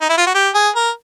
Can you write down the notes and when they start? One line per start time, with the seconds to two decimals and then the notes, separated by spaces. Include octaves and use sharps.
0.01 D#4
0.09 E4
0.18 F4
0.27 F#4
0.34 G4
0.54 G#4
0.75 A#4